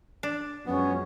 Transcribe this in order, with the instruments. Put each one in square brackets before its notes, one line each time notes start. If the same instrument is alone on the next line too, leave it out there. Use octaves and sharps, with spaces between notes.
[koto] D4
[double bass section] F#2 F3 G#3 [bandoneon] B3 [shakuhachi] C#4